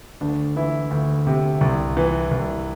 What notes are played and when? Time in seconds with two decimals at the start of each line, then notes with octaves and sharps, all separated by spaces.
0.21 D2 D4
0.56 E3 E4
0.91 D2
1.27 C3
1.61 C2
1.97 E3
2.31 C2